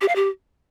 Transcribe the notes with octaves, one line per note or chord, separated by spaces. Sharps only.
G4
F5
G4